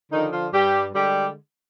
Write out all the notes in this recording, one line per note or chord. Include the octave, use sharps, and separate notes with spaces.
D3 D#3 F3 D#4
F3 F4
G2 G3 G4
D3 G3 G#3 G4